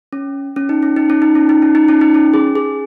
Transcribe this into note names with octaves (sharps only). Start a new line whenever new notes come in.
C#4
C#4
D#4
C#4
D#4
C#4
D#4
C#4
D#4
C#4
D#4
C#4
D#4
C#4
G#4
G#4